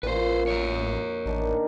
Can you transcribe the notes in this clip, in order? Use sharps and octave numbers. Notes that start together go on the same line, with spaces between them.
A1 A#2 B4 C5 C#6
A#4 C#5
A1 D#3 D4 D#4